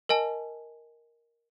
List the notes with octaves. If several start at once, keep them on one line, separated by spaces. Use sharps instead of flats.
A#4 D#5 G#5 A5